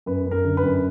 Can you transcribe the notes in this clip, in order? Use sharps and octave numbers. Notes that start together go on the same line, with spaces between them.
F#2 B4
F#2
A#4
D3
B4
F#2